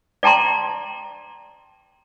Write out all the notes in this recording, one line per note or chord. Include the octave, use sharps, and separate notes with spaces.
D5 G5 A5 A#5 C6